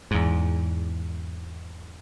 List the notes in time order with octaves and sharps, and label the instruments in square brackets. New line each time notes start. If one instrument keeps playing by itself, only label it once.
[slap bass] E2 G#2